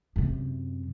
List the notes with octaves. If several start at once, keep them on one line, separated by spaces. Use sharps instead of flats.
F#2 C3